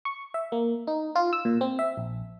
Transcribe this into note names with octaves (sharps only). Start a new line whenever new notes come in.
C#6
E5
A#3
D#4
F4
E6
A#2
C4
E5
A#1